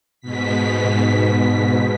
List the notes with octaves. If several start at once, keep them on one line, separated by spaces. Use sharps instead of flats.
G#2 B2 B6